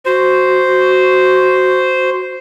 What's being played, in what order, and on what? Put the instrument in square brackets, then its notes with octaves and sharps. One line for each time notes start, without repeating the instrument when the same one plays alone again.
[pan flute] F#4 [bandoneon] C5